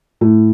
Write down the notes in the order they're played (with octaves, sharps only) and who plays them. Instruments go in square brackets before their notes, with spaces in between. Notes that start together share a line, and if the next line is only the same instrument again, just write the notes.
[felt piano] A2